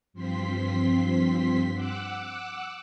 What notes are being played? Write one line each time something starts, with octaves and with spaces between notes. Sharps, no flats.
G2 F3 C4 C6 B6
F#5 D6 E6 F#6